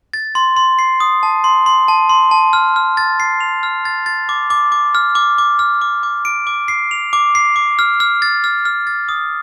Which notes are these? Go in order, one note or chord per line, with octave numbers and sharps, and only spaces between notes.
A6
C6
C6
C7
D#6
A5
C6
C6
A5
C6
A5
F6
F6
A6
C7
F7
F6
A6
A6
D6
D6
D6
F6
D6
D6
F6
D6
D6
D7
D6
C7
F7
D6
C7
D6
F6
F6
A6
F6
F6
A6
D#6